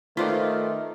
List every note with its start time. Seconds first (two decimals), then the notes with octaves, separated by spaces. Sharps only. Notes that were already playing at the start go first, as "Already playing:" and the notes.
0.17 D#3 A3 F4 B4 C5 D5